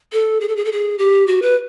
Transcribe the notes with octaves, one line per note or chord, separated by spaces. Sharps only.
A4
G#4
A4
G#4
A4
G#4
G4
F#4
B4